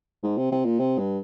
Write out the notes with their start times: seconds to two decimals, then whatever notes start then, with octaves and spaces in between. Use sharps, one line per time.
0.23 G#2
0.37 C3
0.51 C3
0.65 A#2
0.80 C3
0.98 G2